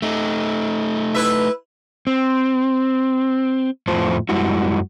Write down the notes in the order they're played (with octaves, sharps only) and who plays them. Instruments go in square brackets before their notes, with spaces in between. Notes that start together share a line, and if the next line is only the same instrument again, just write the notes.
[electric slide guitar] A3 D#4
[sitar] E4 B4 E5
[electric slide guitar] C4
F2 A2 A3 F4 C5 A5
F#2 G3 G#3 E4 F#4